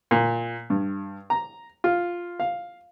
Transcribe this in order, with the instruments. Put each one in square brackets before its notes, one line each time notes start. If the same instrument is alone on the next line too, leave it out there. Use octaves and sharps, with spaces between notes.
[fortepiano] A#2
G2
A#5
F4
F5